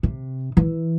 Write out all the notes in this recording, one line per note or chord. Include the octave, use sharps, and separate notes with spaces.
C3
E3